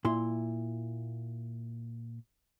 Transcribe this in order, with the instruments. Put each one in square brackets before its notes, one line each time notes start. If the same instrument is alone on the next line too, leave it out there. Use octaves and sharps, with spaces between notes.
[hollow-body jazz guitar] A#2 E4 C6